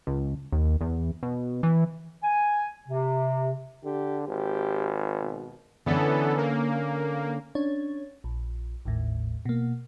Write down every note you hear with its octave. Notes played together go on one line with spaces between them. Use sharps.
C#2
D#2
E2
B2
E3
G#5
C3
D3 G4
G#1 G4
B2
D3 E3 B3 C#4 A4
A#3
C#4 D4 C#5
A#1
G#1 D#2 A2
B2 A#3